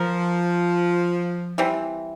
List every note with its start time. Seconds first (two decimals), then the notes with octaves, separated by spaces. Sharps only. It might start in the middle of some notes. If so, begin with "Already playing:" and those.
Already playing: F3 A#4
1.58 E3 G3 C4